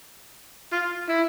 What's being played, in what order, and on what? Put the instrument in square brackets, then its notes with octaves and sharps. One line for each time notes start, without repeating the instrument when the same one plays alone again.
[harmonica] F4
E4